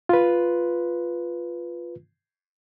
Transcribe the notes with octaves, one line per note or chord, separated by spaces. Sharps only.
F4 B4